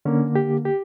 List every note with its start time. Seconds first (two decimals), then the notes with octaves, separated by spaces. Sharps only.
0.05 D3 A#3 C#4
0.35 G4
0.65 G4